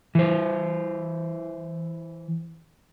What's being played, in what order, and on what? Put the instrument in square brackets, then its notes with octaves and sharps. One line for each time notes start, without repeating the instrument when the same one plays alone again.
[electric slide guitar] E3 C5